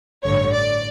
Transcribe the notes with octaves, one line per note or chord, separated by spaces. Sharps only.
A1 G2 D3 C#5
D5